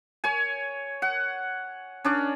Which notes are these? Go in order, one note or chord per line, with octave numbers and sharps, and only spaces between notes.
C#5 G#5
F#5
C#4 D4 D5